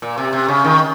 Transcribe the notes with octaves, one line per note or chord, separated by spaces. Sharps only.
A#2
C3
C3
C#3
D#3